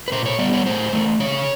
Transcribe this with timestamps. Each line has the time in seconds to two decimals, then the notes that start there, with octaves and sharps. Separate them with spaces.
0.08 B4
0.12 A#2 C5
0.26 C#5
0.39 G3 B3 D5
0.53 C#5
0.66 A2 C5
0.93 E3 A3
1.20 C#3 C#5